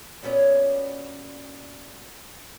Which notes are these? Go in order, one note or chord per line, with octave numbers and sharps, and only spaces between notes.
A#2 F#3 B3 C#4 D5